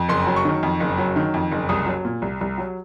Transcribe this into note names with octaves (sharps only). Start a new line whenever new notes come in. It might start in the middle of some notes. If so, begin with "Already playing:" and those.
Already playing: F2
F#1 C6
F#3
C#6
D#3
F2
F#1
F#3
D#3
F2
F#1
C2 D#6
F#3
A#2
C2
C2
F#3